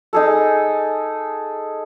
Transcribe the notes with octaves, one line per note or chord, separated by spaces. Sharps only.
D#4 G#4 A4